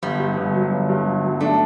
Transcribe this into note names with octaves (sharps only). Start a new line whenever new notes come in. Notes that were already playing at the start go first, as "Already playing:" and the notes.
G1 G3
G2
G1
F#3
G1
G2
G1
F#3
A3 D4